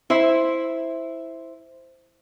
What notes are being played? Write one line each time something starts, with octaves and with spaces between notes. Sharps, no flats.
E4 C5 E5